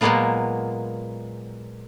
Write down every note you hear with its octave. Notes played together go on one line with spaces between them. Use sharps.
A#2 F#3 G#3 A#3 B3 F4